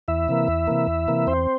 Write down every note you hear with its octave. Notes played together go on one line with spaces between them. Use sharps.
E2 E4 E5
C3 E3 A#3
E2
C3 E3 A#3
E2
C3 E3 A#3
E2 C4 C5